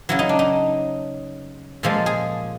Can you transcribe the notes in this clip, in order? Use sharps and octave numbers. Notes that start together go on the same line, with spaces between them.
C#3 F#3 E4
D#4
D4
D#4
A#2 F3 G#3 A4
G#4